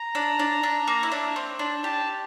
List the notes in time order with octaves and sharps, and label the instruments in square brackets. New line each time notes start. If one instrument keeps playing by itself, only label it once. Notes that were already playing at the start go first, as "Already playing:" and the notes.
Already playing: [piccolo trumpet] A#5
[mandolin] D4
D4
D4
A#3
E4
D4
C4
D4
[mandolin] G4 [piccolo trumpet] A5